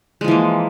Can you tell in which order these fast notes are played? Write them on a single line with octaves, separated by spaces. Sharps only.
G#3 F3 E3 A#3